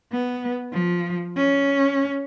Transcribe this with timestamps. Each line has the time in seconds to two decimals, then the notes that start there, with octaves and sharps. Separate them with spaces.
0.12 B3
0.72 F3
1.37 C#4